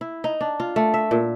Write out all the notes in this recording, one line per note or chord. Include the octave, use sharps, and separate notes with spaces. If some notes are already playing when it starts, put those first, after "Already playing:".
E4
D#4
D4
F4
A3
E5
A#2